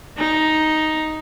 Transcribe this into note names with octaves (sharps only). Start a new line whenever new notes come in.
D#4